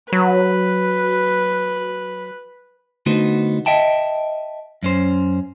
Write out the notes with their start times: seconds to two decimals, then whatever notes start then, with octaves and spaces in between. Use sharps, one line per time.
0.13 F#3 B4
3.06 D3 A3 B3 D#4 F#4 C5
3.66 D#5 E5 G5 A5
4.83 F#2 C#4 C5